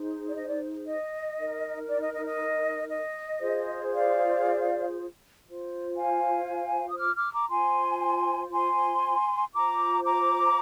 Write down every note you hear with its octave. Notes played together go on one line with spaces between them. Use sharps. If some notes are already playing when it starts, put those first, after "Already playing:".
Already playing: D#4 G#4 C5
D5
D#5
D5
D#5
D#4 A#4
D5
D#5
D#5
D#5
D#5
F4 G#4 C5
D5 F5
F4 C5
F5 G#5
D#6
D6 F6
D6 F6
A#5 D6
F4 C5 G#5 C6
G#5 C6
F4 C5 A#5 D6
A#5 D6